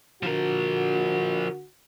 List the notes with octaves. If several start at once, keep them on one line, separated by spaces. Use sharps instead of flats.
D3 F3 F#4 A#4